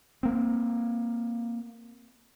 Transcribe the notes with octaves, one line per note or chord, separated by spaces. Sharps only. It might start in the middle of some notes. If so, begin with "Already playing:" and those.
A#3 C4